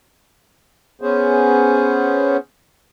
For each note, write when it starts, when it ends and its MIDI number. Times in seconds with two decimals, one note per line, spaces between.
1.02 2.37 59
1.02 2.37 61
1.02 2.37 68
1.02 2.37 72